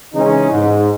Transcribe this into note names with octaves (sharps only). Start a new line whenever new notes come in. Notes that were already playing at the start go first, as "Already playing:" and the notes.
C#3 E3 G#3 C#4 D#4
G#2